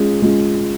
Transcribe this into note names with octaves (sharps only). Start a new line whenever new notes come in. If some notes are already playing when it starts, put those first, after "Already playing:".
Already playing: G#3 C#4 F4
G#3 C#4 F4